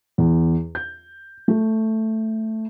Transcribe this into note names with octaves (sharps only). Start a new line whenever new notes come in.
E2
G6
A3